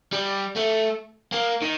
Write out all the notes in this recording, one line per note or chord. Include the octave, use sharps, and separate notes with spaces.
G3
A3
A#3
D#3